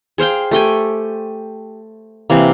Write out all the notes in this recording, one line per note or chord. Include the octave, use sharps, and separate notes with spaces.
G#4 C5 F5 G5
A3 G4 G5 G#5
C3 E3 A#3